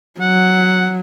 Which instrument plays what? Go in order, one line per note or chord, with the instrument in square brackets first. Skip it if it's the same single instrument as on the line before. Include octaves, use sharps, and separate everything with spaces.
[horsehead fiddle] F#3 [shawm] F#5